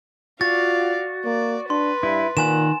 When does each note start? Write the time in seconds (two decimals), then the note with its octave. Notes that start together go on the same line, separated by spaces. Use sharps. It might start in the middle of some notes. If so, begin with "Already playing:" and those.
0.41 F4 F#4 D5 F5 A6
1.25 A#3 D5
1.70 D4 B4 C6
2.03 G2 E4
2.37 A#2 D#3 F#5 G#5 E7